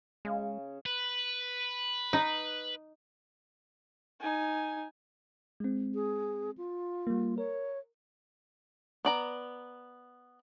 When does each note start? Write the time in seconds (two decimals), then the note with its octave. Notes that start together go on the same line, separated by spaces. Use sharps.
0.25 C#3 G#3
0.86 B4
2.13 D#4
4.20 D#4 G#5
5.60 G#3 C4
5.95 G#4
6.58 F4
7.07 G3 A#3
7.38 A#4 C#5
9.05 B3 D5 A#5